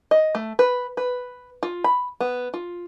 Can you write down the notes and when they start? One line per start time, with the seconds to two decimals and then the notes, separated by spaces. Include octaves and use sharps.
0.11 D#5
0.35 A3
0.59 B4
0.97 B4
1.63 F4
1.84 B5
2.21 B3
2.54 F4